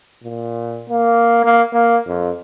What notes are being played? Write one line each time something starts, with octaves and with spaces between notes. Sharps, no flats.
A#2
A#3
A#3
A#3
F2